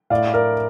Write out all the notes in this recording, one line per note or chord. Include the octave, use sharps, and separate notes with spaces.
A2 D5 F5
A#4 D5